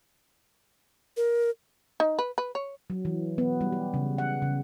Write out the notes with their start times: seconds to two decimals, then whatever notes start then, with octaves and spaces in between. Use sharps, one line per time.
1.17 A#4
2.00 D#4
2.19 B4
2.38 B4
2.55 C#5
2.90 F#3
3.05 E3
3.38 B3
3.61 G3
3.73 G4
3.94 C#3
4.18 F#5
4.42 C#3